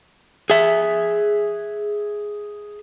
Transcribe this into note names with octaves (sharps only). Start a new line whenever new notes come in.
G#4 E5